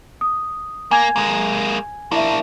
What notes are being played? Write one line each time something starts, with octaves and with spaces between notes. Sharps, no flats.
D#6
A#3 G#5 G#6
G#3 A#3
A#3 D4 E4 E5